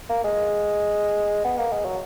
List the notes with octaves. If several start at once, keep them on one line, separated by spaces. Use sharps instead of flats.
A#3
G#3
B3
A#3
G#3
F#3